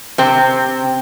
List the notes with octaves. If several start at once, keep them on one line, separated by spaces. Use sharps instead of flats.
C3 C4